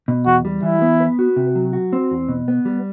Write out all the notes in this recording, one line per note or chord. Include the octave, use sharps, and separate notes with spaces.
B2
E2 F#4
G3
E3 E4
B3
B4
F#4
C3
F#3
F#4
C4
E2
B2
B3
G3